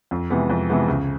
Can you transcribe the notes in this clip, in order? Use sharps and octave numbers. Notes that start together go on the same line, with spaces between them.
F2
C3 E3 G#3 B3
F2
C3 E3 G#3 B3
C#2